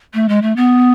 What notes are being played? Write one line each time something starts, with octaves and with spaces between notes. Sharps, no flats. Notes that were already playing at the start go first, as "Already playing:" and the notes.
A3
G#3
A3
B3